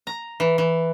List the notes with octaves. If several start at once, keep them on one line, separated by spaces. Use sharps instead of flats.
A#5
E3
E3